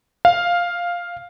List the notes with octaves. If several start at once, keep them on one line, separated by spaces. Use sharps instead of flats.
F5